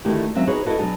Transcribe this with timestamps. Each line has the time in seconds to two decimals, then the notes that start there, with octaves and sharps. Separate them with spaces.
0.05 D3 D#3 A3 E4 F#4 G4
0.35 D#2 F#3 C4 C#4 E5
0.47 D#4 F#4 G#4 B4 C#5
0.66 E4 F#4 A4 B4 D#5
0.79 B2 F#3 D4 G#4 G#5